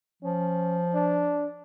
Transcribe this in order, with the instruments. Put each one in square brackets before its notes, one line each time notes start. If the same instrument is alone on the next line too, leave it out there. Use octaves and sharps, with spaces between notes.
[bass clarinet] F3 [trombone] C#4
[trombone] D4